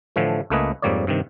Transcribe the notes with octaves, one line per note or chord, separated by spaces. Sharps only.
A2 D3 E3 F3 A3
C#2 A3 A#3 B4 D#5 G#5
F2 G#2 G3 A#3 C#5 D5
G2 C3 D#3